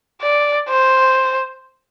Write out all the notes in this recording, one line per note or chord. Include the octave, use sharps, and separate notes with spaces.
D5
C5